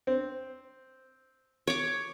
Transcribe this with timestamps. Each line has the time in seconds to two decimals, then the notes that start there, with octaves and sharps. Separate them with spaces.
0.07 C4
1.67 C#5 D6